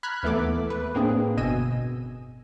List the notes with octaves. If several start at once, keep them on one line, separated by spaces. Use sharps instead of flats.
A#5 B5 F6 F#6 G#6 B6
D#2 E3 A3 B3 A4 D6
A3 B4
A2 A#3 C4 D4 G#4
G1 B2 D#5 G#5 E6 D#7